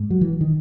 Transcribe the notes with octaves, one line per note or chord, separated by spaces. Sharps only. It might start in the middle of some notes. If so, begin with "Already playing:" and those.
Already playing: G#2
F#3
E3
D#3